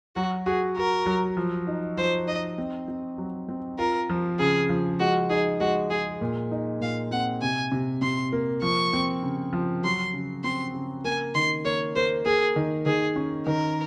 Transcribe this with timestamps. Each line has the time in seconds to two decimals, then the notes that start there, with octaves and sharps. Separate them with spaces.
0.16 F#3 F#4
0.46 F#4 G#4
0.77 F#4 A#4
1.06 F#3
1.37 F3
1.67 D#4
1.97 F3 C5
2.27 D#4 D#5
2.58 C4
2.88 C4
3.18 F#3
3.49 C4
3.78 F4 A#4
4.09 F3
4.39 C#3 G#4
4.69 F3
4.99 G#3 F#4
5.29 D#4 G#4
5.60 G#3 F#4
5.90 G#3 G#4
6.21 A#2
6.51 D#4
6.80 A#2 F5
7.11 C4 F#5
7.42 C3 G#5
7.72 C3
8.01 C3 C6
8.32 A#3
8.62 F3 C#6
8.93 C4
9.23 C#3
9.53 F3
9.84 F#3 C6
10.14 C#3
10.44 C4 C6
10.74 C#3
11.04 A#3 G#5
11.35 D#3 C6
11.65 A#3 C#5
11.95 A#3 C5
12.25 A#3 G#4
12.56 D#3
12.86 D#3 G#4
13.16 C#4
13.47 D#3 A#4